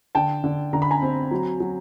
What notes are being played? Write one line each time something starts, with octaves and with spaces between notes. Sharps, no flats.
D3 G5 A5
D3
D3 A#5
B5
G#5 A#5
C4
F#3
F#3